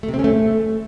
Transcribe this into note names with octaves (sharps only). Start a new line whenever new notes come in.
A3
C3
C4
C#4
A3